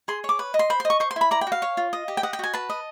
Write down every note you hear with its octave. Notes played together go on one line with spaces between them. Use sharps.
G#4 C6
C#5
D6
B4
D#5
C6
C5 B5
C6
D#5
C#6
C5 C#6
C6
E4 B5
D5 A#5
G5
F#4
F5
C#5
F4
D#5
G4
G5
D#5 F#5
G5
F#4 G#5
B4 A5
D#5